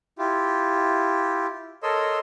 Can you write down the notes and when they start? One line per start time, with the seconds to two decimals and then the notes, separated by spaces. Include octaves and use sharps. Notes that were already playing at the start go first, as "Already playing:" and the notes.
0.18 E4 F4 G4
1.83 A4 A#4 C#5 D#5 C6 E6